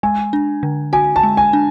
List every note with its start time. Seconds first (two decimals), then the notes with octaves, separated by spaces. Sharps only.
0.03 G#3 G#5
0.33 D4
0.63 D3
0.93 F#4 G#5
1.16 A5
1.23 G#3
1.37 G#5
1.53 D4